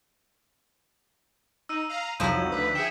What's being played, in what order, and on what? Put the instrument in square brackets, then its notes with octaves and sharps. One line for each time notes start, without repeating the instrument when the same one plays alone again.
[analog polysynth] D#4 [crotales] E6 D#7
[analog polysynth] F5 A#5
[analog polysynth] C2 F2 F#3 [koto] F3 D#4 E4 [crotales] G6 F#7
[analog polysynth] D2 D3 B4 [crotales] D#6 B6
[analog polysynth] G#4 E5 G5 [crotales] D#6 C#7 E7